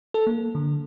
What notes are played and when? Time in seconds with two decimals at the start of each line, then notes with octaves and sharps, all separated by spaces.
0.14 A4
0.27 A#3
0.55 D3